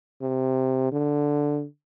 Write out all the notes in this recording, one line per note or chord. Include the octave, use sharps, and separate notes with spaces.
C3
D3